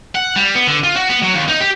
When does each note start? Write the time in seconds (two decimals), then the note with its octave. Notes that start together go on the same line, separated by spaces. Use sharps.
0.15 F#5
0.36 G3
0.55 B3
0.68 D3
0.84 F4
0.96 F#4
1.09 B3
1.22 F#3
1.34 D#2
1.48 D#4
1.60 G4